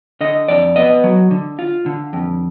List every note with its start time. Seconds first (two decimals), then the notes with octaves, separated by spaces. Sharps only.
0.21 D3 D#5
0.48 F2 D5
0.76 B3 D#5
1.04 F#3
1.31 D3
1.59 F4
1.86 D3
2.13 F2